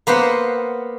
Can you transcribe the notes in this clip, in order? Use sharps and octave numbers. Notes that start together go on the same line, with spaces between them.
A#3 B3 C5 F#5